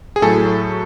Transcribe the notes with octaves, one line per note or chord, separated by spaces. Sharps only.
G#4
A2 F#3 A3 A4